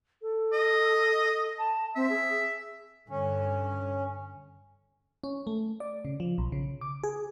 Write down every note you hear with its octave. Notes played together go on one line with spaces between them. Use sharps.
A4
D#5
A5
C4 E5
G#4
G2 D3 C#4
C#4
A3
D5
C#3
F3
B1
C#3
D6
G#4